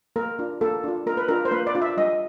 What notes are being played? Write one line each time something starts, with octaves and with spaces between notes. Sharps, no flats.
A#3 A#4
D4 F4
A#3 A4
D4 F4
A#3 A#4
B4
D4 F4 A#4
C5
A#3 B4
D5
D4 F4
E5
G3 D#5